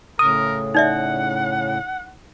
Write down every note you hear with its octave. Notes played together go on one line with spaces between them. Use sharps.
A2 C#3 A#4 D#6
D#4 D5 E5 F#5